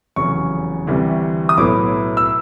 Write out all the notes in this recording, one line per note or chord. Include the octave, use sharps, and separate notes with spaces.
F1 E2 C#3 F#3 C#6
D2 C3 E3 G3
D#6
B1 A2 F#3 B3 E4 D6
E6